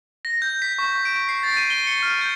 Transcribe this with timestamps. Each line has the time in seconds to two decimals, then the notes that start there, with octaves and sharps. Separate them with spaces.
0.25 A#6
0.42 G6
0.62 B6
0.79 C#6
1.05 D7
1.29 C7
1.43 A6
1.57 D#7
1.70 G7
1.87 C#7
2.03 F6
2.21 G6